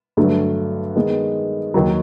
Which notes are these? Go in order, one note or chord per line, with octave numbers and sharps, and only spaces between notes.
G2 D3 F#3 A3
D#3 G#3 B3
D#2 D#3 F#3